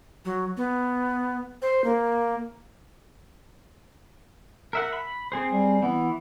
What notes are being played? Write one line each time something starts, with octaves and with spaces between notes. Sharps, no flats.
F#3
B3
C5
A#3
A#4 E5 F#5
B5
C4 G#4 C5
G3
E3 B3